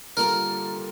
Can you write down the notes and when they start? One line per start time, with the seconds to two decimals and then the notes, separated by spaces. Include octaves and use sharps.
0.17 D3 G3 A#3 F4 A4 A#4